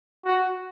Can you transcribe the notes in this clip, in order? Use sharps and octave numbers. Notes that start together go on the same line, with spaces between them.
F#4